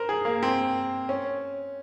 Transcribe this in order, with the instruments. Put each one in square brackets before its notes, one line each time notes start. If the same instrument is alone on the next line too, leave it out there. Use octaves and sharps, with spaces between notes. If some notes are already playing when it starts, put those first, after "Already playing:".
Already playing: [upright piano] A#4 C5
G#4
A#3
C4
C#4